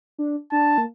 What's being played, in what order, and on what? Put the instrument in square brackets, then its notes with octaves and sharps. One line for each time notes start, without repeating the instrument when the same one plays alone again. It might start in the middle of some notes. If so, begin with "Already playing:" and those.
[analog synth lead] D4
[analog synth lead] D4 [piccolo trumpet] A5
[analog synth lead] A#3